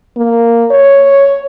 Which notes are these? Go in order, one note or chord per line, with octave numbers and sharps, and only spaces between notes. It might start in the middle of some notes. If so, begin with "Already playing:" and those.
A#3
C#5